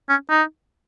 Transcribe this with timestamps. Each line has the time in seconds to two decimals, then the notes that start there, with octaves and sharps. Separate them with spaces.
0.09 C#4
0.30 D#4